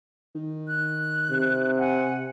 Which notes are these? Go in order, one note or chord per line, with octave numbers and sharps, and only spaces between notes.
D#3
F#6
C3
F#5 G#5